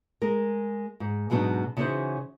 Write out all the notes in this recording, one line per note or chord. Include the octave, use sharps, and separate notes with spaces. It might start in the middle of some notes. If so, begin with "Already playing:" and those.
G#3 A#4
G#2
G#2 B2 F#3 G3 D4 D#4
C#3 E3 C#4 D#4 F#4 C5